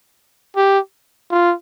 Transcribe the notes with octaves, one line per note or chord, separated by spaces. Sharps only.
G4
F4